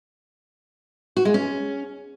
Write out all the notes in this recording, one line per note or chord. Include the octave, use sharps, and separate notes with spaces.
F#4
G#3
C#4